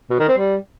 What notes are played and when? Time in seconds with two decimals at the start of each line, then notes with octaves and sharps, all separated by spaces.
0.10 B2
0.19 D#3
0.28 C4
0.37 G3